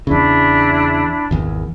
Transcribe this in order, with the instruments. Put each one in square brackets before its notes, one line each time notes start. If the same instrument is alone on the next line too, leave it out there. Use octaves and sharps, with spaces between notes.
[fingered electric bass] E2 C#3 [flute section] D4 E4
[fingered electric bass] G#1 E2